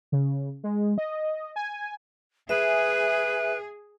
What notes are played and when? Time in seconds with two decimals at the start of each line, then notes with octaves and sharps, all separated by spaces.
0.12 C#3
0.64 G#3
0.98 D#5
1.56 G#5
2.49 G#4 B4 E5